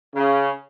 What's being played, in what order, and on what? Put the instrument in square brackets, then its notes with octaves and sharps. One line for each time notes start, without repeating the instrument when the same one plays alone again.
[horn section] C#3